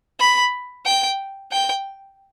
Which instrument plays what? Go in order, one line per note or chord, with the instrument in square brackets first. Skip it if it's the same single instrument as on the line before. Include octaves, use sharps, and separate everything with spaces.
[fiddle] B5
G5
G5